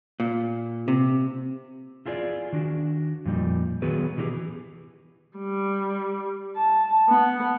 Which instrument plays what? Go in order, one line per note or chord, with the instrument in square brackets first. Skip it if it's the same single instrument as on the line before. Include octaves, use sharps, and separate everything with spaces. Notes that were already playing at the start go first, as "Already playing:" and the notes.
[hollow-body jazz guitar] A#2
C3
[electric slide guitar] E4 F4 G#4 B4 D5
D#3 D4 F#4
F2 A#2 G3 D#4
D#3 F#3 B3 F#4 G#4 B4
B2 E3 F#3 C4 G4 G#4
[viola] G3
A5
B3